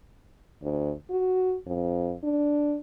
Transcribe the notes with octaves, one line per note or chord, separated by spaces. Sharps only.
D2
F#4
F2
D4